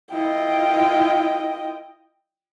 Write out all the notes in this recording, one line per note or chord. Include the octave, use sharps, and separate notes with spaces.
E4 F4 D#5 G5